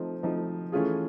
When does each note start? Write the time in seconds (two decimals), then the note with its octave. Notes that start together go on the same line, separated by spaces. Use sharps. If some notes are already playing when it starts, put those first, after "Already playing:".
Already playing: F3 A3 C4 D#4
0.23 F3 A3 C4 D#4
0.72 E3 A3 C#4 F4 G#4